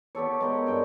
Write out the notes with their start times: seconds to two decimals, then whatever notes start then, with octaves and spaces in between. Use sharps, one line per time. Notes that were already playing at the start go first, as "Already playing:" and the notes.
0.15 B3 G4 A4 C#5
0.40 G#3 A#4 G5
0.66 G2 G5 G#5